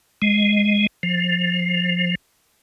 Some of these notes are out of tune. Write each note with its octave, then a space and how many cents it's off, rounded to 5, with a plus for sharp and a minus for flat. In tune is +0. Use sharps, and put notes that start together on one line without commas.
G#3 -5
F3 +20